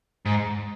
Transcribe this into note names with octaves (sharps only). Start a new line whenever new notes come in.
G#2